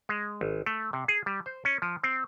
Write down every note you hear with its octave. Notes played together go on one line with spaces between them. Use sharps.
G#3
G#1
A3
C3
G#4
G3
C5
C#4
F3
C4